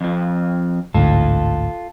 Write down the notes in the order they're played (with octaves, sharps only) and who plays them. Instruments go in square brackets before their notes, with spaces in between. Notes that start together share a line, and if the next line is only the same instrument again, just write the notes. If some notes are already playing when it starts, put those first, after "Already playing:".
[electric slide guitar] F2 F3
[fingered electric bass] A1 D2 G#2 [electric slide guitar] F4 A4